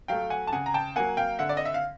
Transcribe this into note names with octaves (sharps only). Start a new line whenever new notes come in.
F#3 A3 F5 G5
F#5 G#5
A5
C#3 F#5 G#5
A#5
G5 A5
F#3 A#3 F#5 G#5
F5 G5
D3 E5 F#5
D5
D#5
E5
F5